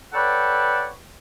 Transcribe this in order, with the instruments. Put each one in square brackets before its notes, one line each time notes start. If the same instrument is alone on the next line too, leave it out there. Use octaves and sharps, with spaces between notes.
[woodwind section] A4 B4 C#5 D5 F#5 G5